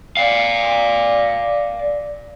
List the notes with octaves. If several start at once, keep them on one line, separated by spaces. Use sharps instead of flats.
D5 F5